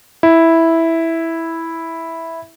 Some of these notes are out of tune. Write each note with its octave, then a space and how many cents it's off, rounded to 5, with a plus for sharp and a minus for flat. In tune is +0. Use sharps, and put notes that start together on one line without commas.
E4 -5